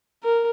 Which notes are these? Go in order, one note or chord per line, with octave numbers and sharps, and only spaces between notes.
A#4